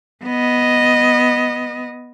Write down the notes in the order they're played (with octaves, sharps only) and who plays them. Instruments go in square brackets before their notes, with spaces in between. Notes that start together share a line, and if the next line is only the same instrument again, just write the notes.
[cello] B3 D#5